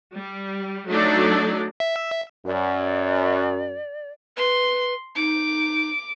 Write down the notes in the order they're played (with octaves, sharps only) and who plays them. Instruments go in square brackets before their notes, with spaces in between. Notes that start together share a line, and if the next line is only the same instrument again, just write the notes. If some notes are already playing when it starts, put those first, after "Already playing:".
[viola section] G3
F#3 A3 D4 D#4 A4 D5
[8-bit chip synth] E5
[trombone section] F#2 [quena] D5
[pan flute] B4 [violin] C6
[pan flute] D#4 [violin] D6